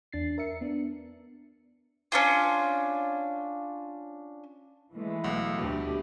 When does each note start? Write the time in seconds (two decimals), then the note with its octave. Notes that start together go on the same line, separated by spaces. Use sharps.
0.13 E2 D4 A6 C7
0.38 A#4 E5 C#7
0.61 B3 D4
2.12 C#4 D4 F4
4.94 E3 G#3 A3
5.24 B1 F#5
5.58 D2 B2 E4 G4